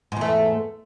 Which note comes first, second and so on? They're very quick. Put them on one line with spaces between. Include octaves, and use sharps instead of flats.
G#2 E2 A3